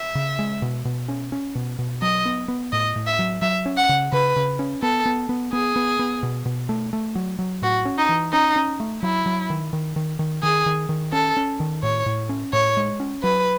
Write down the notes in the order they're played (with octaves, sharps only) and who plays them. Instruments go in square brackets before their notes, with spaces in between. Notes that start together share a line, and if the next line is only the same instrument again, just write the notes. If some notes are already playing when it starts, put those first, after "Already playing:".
Already playing: [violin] E5
[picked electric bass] C#3
G#3
B2
B2
C#4
C#4
B2
B2
[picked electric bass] F#3 [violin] D#5
[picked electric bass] B3
B3
[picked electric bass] A2 [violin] D#5
[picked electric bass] A2
[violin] E5
[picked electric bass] F#3
[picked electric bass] F#3 [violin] E5
[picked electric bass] C#4
[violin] F#5
[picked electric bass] C#3
[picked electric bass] C#3 [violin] B4
[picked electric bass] C#3
C#4
[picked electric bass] B3 [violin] A4
[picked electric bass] B3
B3
[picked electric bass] B3 [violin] G#4
[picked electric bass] B3
B3
B2
B2
A3
A3
F#3
F#3
[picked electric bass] A2 [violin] F#4
[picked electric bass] C#4
[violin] D#4
[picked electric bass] E3
[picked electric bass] C#4 [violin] D#4
[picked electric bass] C#4
A3
[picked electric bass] F#3 [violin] E4
[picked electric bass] F#3
D#3
D#3
D#3
D#3
[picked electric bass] D#3 [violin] G#4
[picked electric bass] D#3
D#3
[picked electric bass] C#4 [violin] A4
[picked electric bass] C#4
D#3
[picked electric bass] A2 [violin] C#5
[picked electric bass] A2
C#4
[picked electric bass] A2 [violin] C#5
[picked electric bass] G#3
C#4
[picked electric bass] F#3 [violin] B4